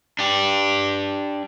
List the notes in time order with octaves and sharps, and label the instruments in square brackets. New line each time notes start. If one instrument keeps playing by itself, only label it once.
[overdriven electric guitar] D4 G4